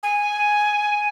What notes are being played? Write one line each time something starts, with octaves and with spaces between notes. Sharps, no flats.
G#5